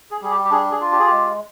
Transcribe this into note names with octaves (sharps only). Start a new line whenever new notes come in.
G#4
G3 G#4
G4
G4
D4 G#4
G#4
F4
G4
G#4
G#3 G4